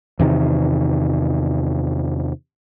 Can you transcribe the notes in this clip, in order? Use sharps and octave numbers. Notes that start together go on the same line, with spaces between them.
E2 C3 D#3